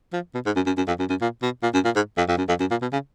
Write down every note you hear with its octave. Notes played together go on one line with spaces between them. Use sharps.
F3
B2
G#2
F#2
F#2
F#2
F2
F#2
F#2
A#2
B2
A#2
F#2
A#2
G#2
F2
F2
F#2
F2
F#2
A#2
B2
C#3